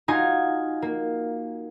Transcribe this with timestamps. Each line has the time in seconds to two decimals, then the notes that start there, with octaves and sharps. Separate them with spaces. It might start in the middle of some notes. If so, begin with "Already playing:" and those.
0.08 D#4 F4 F#4 G#5 A#5
0.82 A#3